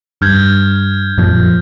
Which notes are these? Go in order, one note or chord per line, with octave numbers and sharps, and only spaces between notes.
G2 F6 G6 G#6
F#2 A#2 F3